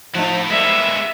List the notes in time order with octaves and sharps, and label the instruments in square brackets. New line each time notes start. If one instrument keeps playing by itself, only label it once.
[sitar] F3 D#4 [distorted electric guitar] A3 E4
[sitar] G3 A#3 [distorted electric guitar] G#3 B3 [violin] E5